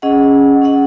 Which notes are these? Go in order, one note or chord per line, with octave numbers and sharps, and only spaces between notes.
C#4 G#4 D#5 F#5
C#4 G#4 D#5 F#5